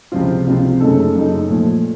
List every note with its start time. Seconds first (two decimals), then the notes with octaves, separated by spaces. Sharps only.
0.12 C#2 C3 F3 C4 F4
0.46 C#2 C3 F3 C4 F4
0.80 F#2 C#3 A3 D#4 A4
1.15 F#2 C#3 A3 D#4 A4
1.49 A#2 F3 A3